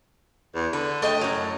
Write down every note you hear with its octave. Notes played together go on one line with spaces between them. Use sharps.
E2
D3 B4
A3 D#5 G5
F#2 A2 F#3